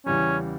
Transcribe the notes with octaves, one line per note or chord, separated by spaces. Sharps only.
E2 C#3 E3 G3 C#4